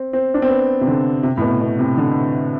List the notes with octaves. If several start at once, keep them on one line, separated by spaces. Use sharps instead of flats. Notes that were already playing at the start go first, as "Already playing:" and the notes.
Already playing: C4
C4
D4
C4
B3
C3
D3
C3
A2
B2
B2
C3
D3